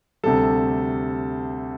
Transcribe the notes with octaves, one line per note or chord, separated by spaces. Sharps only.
D2 C3 G3 A4